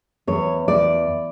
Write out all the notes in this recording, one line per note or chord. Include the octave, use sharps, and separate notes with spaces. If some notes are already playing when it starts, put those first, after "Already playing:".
E2 C#5
E2 D5